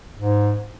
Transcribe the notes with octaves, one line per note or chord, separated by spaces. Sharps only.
G#2